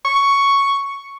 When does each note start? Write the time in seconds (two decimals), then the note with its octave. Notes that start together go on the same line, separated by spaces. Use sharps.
0.05 C#6